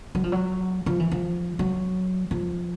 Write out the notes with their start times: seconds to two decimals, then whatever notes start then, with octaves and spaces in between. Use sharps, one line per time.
0.15 F#3
0.24 F3
0.32 F#3
0.86 F3
0.99 E3
1.12 F3
1.59 F#3
2.31 F3